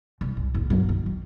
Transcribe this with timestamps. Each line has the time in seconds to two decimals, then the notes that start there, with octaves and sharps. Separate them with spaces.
0.21 C2
0.37 C2
0.54 C#2 A#2
0.70 G1 F#3
0.89 D#3
1.06 D#3